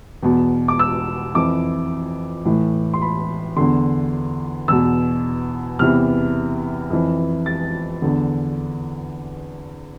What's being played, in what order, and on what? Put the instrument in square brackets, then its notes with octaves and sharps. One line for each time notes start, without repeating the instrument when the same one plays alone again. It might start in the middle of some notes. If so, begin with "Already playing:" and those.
[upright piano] E2 B2
D6
E6
F2 E3 D6
A2 E3
C6
B5
E2 D3 C6
E2 B2 E6
E2 C3 E3 F6
F2 E3
A6
E2 D3